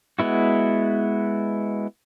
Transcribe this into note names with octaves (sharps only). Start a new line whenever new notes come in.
G#3 B3 E4 F#4